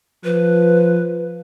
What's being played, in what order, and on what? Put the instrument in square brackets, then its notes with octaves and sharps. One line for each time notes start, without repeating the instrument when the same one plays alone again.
[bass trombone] F3 [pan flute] B4